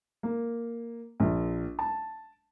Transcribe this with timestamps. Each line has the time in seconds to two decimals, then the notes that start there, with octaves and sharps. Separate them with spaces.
0.23 A#3
1.20 A#1
1.79 A5